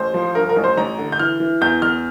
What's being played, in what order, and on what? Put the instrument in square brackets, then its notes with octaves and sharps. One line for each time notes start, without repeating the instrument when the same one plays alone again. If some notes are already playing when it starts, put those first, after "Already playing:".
Already playing: [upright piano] A1 C5
F3
G2 A#4
A#4
A1
C5
A1 A#5
D3
G6
E3 F6
E3
E2 G6
E2 F6